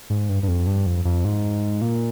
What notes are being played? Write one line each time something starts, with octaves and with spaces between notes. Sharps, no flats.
G#2
G2
G2
F2
G2
F2
F2
G#2
A#2